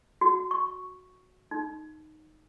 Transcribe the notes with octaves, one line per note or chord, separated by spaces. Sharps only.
F#4
C#6
D#4